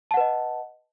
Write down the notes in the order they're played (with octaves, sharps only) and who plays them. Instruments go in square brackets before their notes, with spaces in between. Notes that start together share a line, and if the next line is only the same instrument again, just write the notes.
[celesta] A5
F#5
B4
D#5